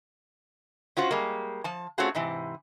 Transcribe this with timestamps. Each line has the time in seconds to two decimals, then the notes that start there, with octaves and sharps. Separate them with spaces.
0.97 C#4 F4 F#4 C5
1.11 G3 G#3 A#3
1.64 F3 A5
1.98 A3 C4 C#4 F4 F#4 G#4
2.15 G#2 C3 E3